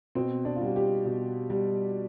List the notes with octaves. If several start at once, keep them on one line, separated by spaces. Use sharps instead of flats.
B2 C4
D4
F4
G3 F#4
G4
B2
G3